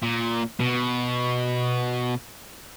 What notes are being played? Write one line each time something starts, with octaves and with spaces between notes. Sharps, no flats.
A#2
B2